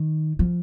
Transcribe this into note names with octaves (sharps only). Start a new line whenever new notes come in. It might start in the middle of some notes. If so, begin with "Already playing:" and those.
Already playing: D#3
F3